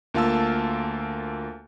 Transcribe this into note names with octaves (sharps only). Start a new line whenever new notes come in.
D2 A#3 F4 F5 A5 E6